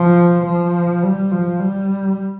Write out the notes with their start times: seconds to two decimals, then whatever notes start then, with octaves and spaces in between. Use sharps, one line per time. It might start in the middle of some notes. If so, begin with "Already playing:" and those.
Already playing: F3
0.46 F3
1.03 G3
1.31 F3
1.59 G3